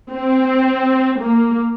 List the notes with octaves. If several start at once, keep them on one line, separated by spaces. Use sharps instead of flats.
C4
A#3